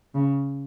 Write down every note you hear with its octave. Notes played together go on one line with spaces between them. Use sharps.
C#3